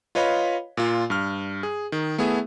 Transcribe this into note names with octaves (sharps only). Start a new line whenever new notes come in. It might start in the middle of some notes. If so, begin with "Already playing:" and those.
F4 B4 C#5 D#5 F5 B5
A#2 F4
G2 F6
G#4
D#3
A3 B3 E4 G#4 E5